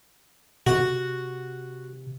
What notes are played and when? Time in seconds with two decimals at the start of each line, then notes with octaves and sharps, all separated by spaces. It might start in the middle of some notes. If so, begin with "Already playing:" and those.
0.67 C3 F#4